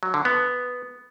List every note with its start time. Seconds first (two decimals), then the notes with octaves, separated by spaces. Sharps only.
0.03 F#3
0.14 D3
0.25 B3